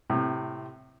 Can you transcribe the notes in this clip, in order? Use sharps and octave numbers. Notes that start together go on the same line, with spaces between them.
A2 C3